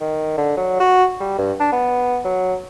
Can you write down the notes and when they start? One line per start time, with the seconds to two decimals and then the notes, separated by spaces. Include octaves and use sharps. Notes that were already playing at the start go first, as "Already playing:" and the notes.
0.01 D#3
0.37 D3
0.57 F#3
0.80 F#4
1.20 G3
1.38 G2
1.60 D4
1.72 B3
2.24 F#3